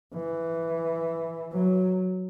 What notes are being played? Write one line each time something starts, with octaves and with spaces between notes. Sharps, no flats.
E3
F#3